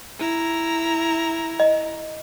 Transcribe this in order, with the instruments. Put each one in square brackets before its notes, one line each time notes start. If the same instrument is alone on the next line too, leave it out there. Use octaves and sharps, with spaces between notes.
[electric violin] E4 A#5
[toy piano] D#5